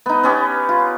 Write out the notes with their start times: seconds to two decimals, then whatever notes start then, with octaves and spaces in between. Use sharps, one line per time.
0.06 B3 D#4
0.23 B3 C#4 G4
0.69 F4